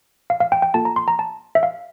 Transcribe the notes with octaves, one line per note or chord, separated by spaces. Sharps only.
F5
F5
G5
G5
A#3 F4 A4 A5
A#5
C6
A#5
A5
E5
F5